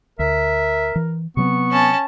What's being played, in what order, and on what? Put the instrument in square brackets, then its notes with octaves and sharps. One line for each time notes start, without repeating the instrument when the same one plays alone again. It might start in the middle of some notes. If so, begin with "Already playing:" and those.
[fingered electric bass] D2 [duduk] A#4 [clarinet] E5
[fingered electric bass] E3
[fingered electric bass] C3 F#3 C4 [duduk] B3 [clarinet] C#6
[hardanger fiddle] C#4 A5